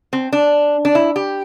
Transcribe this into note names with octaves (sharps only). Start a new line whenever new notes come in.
C4
D4
D4
E4
G4